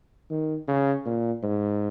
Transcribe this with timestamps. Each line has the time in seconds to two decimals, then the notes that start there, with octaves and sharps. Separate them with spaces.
0.30 D#3
0.68 C#3
1.06 A#2
1.43 G#2